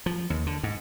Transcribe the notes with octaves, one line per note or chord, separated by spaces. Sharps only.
F3
D#2
D3
G#2